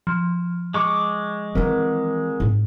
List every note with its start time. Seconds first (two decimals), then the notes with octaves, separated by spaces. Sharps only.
0.07 F3
0.74 G#3 C#6 D6
1.55 D#3 E3 C4 A#4
2.40 G#2